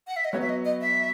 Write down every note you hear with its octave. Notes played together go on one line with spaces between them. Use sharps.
F#5
E5
D#5
F#3 B3 F#4 C#5
E5
D#5
D#5
E5